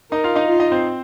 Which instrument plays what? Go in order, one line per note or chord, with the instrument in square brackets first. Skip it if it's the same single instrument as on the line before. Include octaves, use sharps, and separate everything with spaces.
[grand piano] D#4 D#5 [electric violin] A#4
[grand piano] F4 F5
D#4 D#5
[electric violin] F4
[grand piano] D#4 D#5
C4 C5